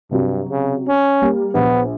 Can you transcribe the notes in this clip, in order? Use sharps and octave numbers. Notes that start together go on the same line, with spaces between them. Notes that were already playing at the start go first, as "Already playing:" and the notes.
G2 C3 F#3
C#3
C#4
G3 A#3
A#1 B3